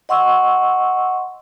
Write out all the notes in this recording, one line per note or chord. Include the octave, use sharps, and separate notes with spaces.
D#5 F#5 C6 C#6 E6